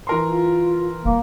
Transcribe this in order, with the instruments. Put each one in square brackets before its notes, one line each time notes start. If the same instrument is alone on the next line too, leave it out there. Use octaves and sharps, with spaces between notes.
[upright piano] E3 A#4 C6
[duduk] F4
[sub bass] D#1 [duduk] A#3